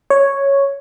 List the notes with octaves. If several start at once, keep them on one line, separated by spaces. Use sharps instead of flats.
C#5